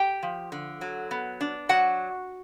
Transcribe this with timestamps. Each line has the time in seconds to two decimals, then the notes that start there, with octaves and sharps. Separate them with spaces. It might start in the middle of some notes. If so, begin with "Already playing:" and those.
Already playing: G4 G5
0.23 F3
0.52 D3
0.81 F#3
1.11 B3
1.41 D4
1.69 F#3 F#4 F#5